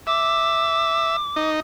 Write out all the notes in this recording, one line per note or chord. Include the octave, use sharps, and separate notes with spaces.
E5 D6
D#4